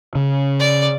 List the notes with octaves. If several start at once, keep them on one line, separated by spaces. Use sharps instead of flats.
C#3
D5